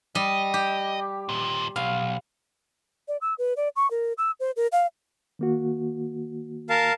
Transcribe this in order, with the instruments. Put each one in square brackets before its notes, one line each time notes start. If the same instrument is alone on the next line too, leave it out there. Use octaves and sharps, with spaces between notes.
[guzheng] G3 [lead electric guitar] D#5
[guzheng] G4
[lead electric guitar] D#2 A#2
[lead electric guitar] B1 [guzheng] F5
[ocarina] D5
E6
B4
D5
C#6
A#4
E6
C5
A#4
F5
[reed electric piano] D#3 A#3 F#4
[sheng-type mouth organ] A#4 F5 A5